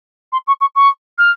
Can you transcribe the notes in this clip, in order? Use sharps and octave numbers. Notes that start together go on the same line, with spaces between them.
C6
C#6
C#6
C#6
F6